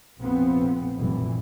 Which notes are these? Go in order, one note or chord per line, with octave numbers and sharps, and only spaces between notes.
F1 A#1 F2 F3 B3 C4
F1 A#1 F#2 B2 E3 G3